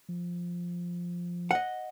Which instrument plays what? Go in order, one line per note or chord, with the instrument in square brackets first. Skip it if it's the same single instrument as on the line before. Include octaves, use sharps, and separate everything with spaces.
[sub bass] F3
[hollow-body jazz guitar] D#5 F#5